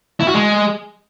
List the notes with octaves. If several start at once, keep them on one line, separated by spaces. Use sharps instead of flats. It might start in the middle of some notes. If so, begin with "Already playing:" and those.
E4
F#4
G#3